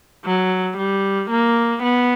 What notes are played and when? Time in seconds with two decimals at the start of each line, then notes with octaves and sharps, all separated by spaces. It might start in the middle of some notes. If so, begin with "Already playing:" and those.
0.25 F#3
0.77 G3
1.30 A#3
1.82 B3